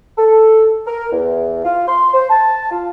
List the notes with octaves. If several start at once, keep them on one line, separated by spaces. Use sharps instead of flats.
A4
A#4
E2
F4
C6
C5
A5
F4